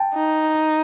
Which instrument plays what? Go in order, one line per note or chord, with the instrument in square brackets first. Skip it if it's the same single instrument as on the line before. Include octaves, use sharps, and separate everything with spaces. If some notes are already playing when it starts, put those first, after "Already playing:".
Already playing: [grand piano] G5 A5
[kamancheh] D#4